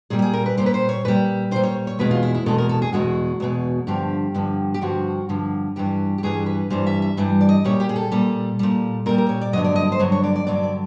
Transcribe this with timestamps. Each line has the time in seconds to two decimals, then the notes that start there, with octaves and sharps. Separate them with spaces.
0.10 A#2 G3 G#4
0.19 G4
0.22 G#4
0.33 A#4
0.46 B4
0.57 A#2 G3 C5
0.66 B4
0.74 C5
0.89 C#5
1.05 A#2 G3 B4
1.51 A#2 G3 C5
1.63 C#5
1.87 C#5
1.99 E2 B2 G#3 B4
2.11 F4
2.23 E4
2.34 E4
2.46 E2 B2 G#3 A4
2.58 A#4
2.69 A4
2.82 G#4
2.93 E2 B2 G#3 F#4
3.40 E2 B2 G#3
3.87 G2 D3 F3 G4
4.34 G2 D3 F3
4.74 G4
4.81 G2 D3 F3 F#4
5.29 G2 D3 F3
5.76 G2 E3 G3 G4
6.18 G4
6.23 G2 E3 G3 G#4
6.46 B4
6.70 G2 E3 G3 C5
6.87 E5
7.02 E5
7.17 G2 E3 G3
7.41 D5
7.49 D#5
7.65 A#2 G3 C#5
7.80 G4
7.89 G#4
7.96 A4
8.12 A#2 G3
8.59 A#2 G3
9.06 A#2 G3 A#4
9.18 A#4
9.29 C#5
9.41 D5
9.53 G2 D3 F#3 D#5
9.64 D5
9.76 D#5
9.92 C5
9.99 G2 D3 F#3 C#5
10.12 C#5
10.23 D5
10.36 D5
10.47 G2 D3 F#3 D5
10.63 D5